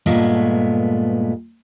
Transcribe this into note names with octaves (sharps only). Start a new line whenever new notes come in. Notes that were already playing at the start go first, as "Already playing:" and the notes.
G2 A#2 G#3 A3 B3